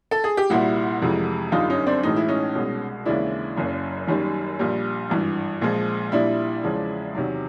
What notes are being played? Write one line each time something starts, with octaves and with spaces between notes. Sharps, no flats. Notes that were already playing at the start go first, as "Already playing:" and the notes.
A4
G#4
G4
C2 A#2 G3 E4 F#4
F1 F2 C3 E3 G#3
G1 F#2 D3 G3 D#4 F4
C#4 D#4
C4 D4
B1 A2 E3 G#3 D#4
E4
C#4 D#4
C2 B2 G#3
D#2 C#3 E3 G#3 D4 E4
F#1 F#2 C#3
F#1 F#2 D#3 G3
A#1 A#2 G3
G#1 G2 E3
A#1 A#2 F3 G#3
A#1 A#2 G3 D4 E4
E2 C#3 F3 G#3
E2 C3 D#3 F#3